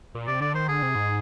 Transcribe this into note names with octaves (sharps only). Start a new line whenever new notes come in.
A#2
C3 D5
D3 D5
D#3 C5
D3 G#4
C3
G#2